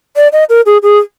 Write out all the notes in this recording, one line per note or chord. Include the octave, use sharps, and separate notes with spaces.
D5
D#5
A#4
G#4
G#4